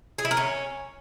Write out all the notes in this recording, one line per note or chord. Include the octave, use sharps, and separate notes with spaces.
G#4
E4
A#4
C#4